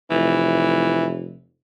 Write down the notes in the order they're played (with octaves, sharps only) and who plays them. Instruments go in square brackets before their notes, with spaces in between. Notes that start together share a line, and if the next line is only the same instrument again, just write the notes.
[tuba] F1 [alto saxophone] E3